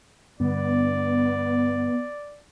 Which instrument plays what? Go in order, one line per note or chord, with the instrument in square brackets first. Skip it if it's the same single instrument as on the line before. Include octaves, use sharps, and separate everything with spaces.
[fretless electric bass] G2 D3 [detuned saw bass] B3 [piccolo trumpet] D5